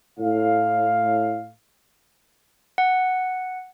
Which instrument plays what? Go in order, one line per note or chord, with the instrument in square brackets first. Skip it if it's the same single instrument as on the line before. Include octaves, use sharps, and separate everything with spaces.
[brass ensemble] A2 F5
[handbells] F#5